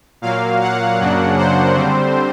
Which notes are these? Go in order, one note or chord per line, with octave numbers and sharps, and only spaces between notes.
A#2 F#3 A#3 F5
F#5
F#2 C#3 F#3 A#3 D4
C5
D3 G3 C4